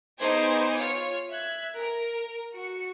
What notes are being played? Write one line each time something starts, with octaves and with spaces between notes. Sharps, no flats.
B3 D#4 G#4 C5 D6 G#6
F4 C#5
E5 F#6 G#6
A#4
F#4 C#7